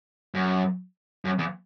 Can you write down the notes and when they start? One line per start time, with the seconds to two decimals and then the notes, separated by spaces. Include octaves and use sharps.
0.34 F#2
1.25 F#2
1.39 E2